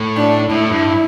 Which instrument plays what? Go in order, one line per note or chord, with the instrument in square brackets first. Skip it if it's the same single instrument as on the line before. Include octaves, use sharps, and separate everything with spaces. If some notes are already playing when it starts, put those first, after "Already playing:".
Already playing: [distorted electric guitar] A2
[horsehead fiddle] D4
[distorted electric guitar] A2 [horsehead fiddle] E4
[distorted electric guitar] G2